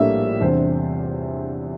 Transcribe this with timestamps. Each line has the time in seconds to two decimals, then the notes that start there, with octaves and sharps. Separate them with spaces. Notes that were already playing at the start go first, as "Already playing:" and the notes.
Already playing: A#1 A2 G3 A#3 D4 E5
0.40 E2 C3 G3 D4 C5